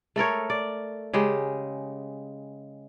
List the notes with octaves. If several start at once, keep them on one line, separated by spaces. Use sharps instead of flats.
A3 A4 A#4 C#5
D5
C#3 G#3 G4